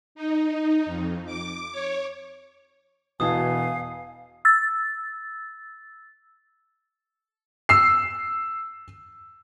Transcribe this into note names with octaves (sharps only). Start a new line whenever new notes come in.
D#4
F2
D6
C#5
E1 B2 E3 F5 G#5 A5 D#6
E6 A6
E6 C7